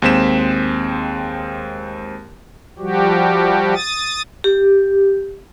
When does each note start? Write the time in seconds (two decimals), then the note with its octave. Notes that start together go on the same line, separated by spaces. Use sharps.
0.02 D#2 G#3 C4 B6 E7
2.79 F3 G3 F#4 G4
3.74 D#6 A6
4.44 G4